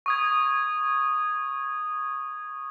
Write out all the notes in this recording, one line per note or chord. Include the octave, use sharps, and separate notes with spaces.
C#6 D#6 G#6